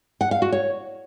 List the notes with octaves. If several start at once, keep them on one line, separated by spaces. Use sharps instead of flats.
F#5
F5
F#4
C#5